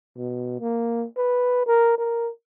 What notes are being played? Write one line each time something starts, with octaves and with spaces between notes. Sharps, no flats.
B2
A#3
B4
A#4
A#4